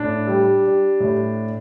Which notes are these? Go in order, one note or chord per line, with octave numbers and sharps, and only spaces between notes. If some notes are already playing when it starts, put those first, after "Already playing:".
Already playing: A2 D4
G3
G3
A2